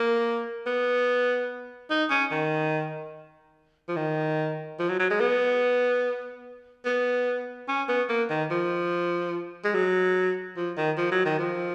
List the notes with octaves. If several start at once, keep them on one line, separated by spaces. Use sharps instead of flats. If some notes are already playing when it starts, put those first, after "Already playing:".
Already playing: A#3
B3
D#4
C#4
D#3
F3
D#3
F3
F#3
F#3
G#3
B3
B3
C#4
B3
A#3
D#3
F3
G#3
F#3
F3
D#3
F3
F#3
D#3
F3